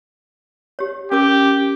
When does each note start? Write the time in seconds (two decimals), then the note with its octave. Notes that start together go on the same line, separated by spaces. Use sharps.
0.79 G4 C#5
1.12 C#4 G4 A#4 D6